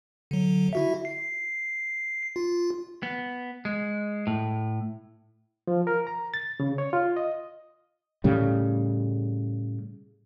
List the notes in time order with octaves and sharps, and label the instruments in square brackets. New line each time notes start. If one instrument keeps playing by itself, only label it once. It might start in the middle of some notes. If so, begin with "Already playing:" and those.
[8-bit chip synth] D3 F#3
E4 F#4 E5
C7
F4
[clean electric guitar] B3
G#3
A2
[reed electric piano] F3
A#4
A#5
A6
C#3
C#5
F4
D#5
[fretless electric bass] A2 C#3 G3